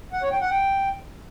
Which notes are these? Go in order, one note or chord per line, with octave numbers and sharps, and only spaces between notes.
F#5
C#5
G5
F#5
G5